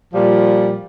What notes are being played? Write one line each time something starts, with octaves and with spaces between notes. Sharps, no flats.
A#2 F3 G3